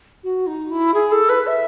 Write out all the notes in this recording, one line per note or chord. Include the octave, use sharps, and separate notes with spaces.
F#4
D#4
E4
G#4
A4
B4
E5